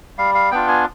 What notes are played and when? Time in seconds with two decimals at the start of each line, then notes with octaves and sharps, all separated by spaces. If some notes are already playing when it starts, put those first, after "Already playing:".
0.18 G3 F5
0.35 F5
0.51 B3 D4 F4 G5
0.68 G#5